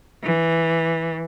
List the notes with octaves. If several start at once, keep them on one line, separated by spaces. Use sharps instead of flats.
E3